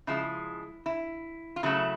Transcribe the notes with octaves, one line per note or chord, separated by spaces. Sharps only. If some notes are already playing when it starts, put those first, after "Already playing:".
C#3 F3 G#3 E4
E4
F4
C#3 F#3 A3 E4